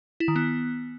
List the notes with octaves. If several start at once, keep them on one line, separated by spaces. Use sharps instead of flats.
E4
D#3
B3